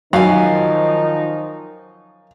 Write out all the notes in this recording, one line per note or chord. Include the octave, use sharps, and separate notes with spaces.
F#2 D#3 F3 D#4 F5 G#5